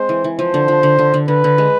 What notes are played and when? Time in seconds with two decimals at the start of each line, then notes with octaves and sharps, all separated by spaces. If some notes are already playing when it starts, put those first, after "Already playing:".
Already playing: G#3 C4 C5
0.09 E3
0.24 E3
0.39 F3 C5
0.54 D3
0.68 F3
0.83 D3
0.99 D3
1.14 D3
1.28 D3 B4
1.44 D3
1.58 G#3